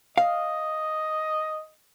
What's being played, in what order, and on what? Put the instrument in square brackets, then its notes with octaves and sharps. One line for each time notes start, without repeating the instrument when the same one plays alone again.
[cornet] D#5 [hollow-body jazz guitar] F5